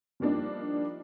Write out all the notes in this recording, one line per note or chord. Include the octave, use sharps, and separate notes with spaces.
F3 G3 A#3 D4 D#4